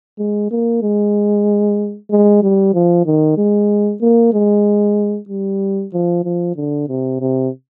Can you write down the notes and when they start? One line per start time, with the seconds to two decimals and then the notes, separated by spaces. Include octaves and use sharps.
0.18 G#3
0.51 A#3
0.82 G#3
2.10 G#3
2.42 G3
2.74 F3
3.06 D#3
3.38 G#3
4.01 A#3
4.33 G#3
5.29 G3
5.93 F3
6.25 F3
6.56 D3
6.88 C3
7.20 C3